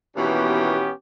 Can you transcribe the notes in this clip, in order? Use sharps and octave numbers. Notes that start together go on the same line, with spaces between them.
D#2 B2 E3 B3 C#4 G4